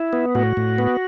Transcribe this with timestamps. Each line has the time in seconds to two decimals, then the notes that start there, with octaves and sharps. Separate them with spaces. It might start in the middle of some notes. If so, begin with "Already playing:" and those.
Already playing: E4
0.13 B3
0.35 A2 F#4
0.57 A2
0.78 B3